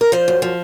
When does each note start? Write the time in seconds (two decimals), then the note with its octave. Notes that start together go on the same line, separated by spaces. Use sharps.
0.01 A#4
0.12 F3 C5
0.28 F#2
0.42 F3